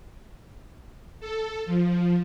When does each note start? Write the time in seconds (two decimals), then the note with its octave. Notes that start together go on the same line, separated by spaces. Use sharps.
1.20 A4
1.66 F3